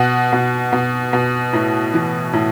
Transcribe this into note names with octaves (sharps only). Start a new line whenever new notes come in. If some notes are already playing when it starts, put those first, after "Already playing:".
Already playing: B2 F#5
B2
B2
B2
A2
E3
A2